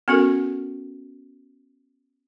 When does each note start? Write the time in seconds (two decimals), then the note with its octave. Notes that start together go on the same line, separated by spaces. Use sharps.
0.08 B3 C#4 F#4 A4 A#4